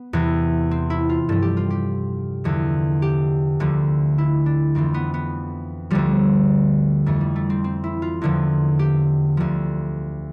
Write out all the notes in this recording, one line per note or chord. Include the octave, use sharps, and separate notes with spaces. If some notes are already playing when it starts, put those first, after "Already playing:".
Already playing: B3
E2 C3 E3
C4
E4
F4
G2 F3 A4
G4
F4
G4
E2 D3 F3
G4
D2 D3 F3
E4
D4
F2 E3 C4
B3
B3
D2 D3 F3 G3
F2 E3 A3
G3
A3
C4
C4
E4
F4
E2 D3 F3
G4
D2 D3 F3